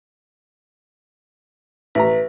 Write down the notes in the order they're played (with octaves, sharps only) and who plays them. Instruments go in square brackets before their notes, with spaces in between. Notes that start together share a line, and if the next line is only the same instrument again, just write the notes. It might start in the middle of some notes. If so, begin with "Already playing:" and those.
[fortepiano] A1 A#5 [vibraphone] B4